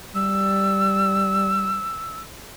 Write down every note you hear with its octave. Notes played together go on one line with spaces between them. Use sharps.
G3 E6